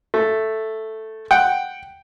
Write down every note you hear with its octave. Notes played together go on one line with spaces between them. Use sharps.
A3
F#5 G5